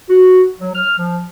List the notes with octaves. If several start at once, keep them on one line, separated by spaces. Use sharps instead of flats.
F#4
F#3
F6
F3